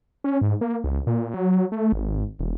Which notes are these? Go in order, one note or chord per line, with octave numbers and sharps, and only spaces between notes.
C#4
G#2
A#3
C#2
A#2
F#3
A3
G#1
E1